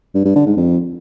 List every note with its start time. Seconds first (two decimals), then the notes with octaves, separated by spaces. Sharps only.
0.15 G2
0.25 G2
0.36 D3
0.46 G#2
0.57 F2